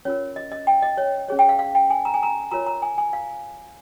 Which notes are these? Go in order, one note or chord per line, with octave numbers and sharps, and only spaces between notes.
C#4 F4 A#4 C#5
D#5
D#5
G5
D#5
C#5
C#4 G#4 C#5
G5
F5
F5
G5
G#5
A#5
G#5
A#5
F4 A#4 C#5 A#5
A#5
G#5
G#5
F5